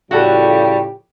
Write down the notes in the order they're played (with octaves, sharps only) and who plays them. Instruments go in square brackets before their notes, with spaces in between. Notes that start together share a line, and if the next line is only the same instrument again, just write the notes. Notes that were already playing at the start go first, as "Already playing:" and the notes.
[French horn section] A2 C#3 F3 [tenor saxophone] G3 [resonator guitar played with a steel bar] F#4 A4 [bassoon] G4